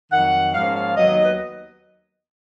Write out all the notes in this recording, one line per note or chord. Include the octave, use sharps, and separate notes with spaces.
F2 D#3 F#3 F#5
G#2 F3 A#3 C#4 F5
F5
D#2 D#3 F#3 B3 D#5
B4